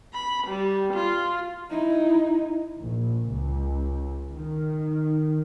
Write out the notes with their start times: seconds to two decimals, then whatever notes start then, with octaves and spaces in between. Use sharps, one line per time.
0.13 B5
0.47 G3
0.93 F4
1.71 D#4 E4
2.81 A#1
3.31 C#2
4.33 D#3